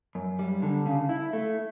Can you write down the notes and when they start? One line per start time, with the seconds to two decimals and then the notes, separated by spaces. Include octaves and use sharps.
0.15 F#2
0.39 G3
0.62 D3
0.86 C#3
1.09 E4
1.33 A3